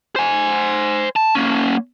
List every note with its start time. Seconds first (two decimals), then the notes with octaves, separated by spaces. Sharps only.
0.16 C5 G#5
1.16 A5
1.35 A#3 C#4